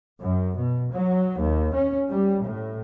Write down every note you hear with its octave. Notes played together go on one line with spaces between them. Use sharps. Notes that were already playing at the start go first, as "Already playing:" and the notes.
F#2
B2
F#3
D#2
C#4
G3
A2